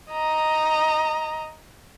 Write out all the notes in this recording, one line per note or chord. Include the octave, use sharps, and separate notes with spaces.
D#5 A#5